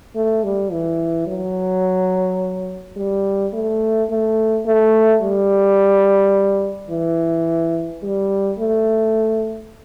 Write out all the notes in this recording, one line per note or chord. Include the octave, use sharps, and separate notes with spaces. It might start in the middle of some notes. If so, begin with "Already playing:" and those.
A3
G3
E3
F#3
G3
A3
A3
A3
G3
E3
G3
A3